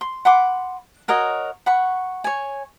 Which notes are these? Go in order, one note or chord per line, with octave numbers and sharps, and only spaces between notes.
C6
F#5 B5 C6 D6
F#4 A#4 C#5 D#5
F#5 B5 C#6
C#5 G#5